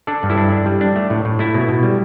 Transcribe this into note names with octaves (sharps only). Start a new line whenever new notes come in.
D4 A4 D5
G2
E4 A4
D4
D4
G3
D4
A3
A2
A2
A3 E4
B2
B2
G3